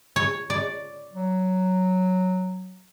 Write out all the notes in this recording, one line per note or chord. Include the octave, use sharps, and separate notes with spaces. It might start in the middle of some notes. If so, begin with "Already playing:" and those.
C#5
D5
F#3